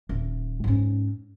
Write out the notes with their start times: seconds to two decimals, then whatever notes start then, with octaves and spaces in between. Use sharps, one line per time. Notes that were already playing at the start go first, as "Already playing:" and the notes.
0.09 D#1
0.64 G#2 C#4